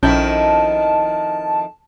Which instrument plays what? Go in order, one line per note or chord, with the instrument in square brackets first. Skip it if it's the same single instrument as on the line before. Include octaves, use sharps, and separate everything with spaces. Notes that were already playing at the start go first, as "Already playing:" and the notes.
[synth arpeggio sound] A#1 C#4 G6 [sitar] F2 D#3 E4 [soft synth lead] A5